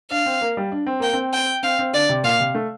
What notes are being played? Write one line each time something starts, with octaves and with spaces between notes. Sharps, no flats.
D4 F5
C4
A#3
G3
D4
C4
A#3 G5
C4
G5
C4 F5
C4
D3 D5
C3
A#2 F5
C3
A3